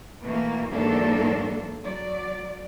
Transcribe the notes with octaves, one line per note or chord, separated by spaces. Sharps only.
B2 E3 A3 A#3
E2 G#2 F#3 A#3 D4 A4
F#3 D5